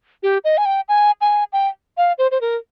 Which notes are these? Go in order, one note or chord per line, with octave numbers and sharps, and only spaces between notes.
G4
D#5
G#5
G5
G#5
G#5
G5
F5
C5
C5
A#4